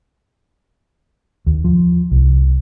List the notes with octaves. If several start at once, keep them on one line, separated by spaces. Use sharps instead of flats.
D#2
F3
C2